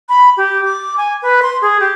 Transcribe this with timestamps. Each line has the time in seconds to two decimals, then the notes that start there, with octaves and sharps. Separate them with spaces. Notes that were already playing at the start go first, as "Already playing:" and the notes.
0.09 B5
0.37 G4
0.65 D6
0.97 G#5
1.22 B4
1.42 C6
1.62 G#4
1.80 G4